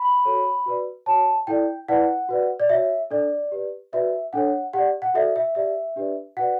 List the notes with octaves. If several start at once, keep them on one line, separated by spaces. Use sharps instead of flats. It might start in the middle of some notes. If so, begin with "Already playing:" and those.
Already playing: B5
F#4 A4 C#5
F#4 B4 D5
F#4 C#5 A5
E4 A4 D5 G5
E4 B4 D5 F#5
F#4 B4 D5
D5
F#4 C#5 E5
D4 A4 D5
G4 B4 D5
F#4 B4 D5 E5
D4 A4 C#5 F#5
G4 D5 F#5
F#5
F#4 A4 D5 E5
E5
G4 D5 E5
D4 G4 B4 D5
F#4 B4 D5 F#5